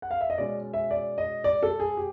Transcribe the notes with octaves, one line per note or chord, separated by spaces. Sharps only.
F#5
F5
E5
D#5
B2 G#3 C#4 D5
E5
D5
D#5
D5
A4
G#4
G4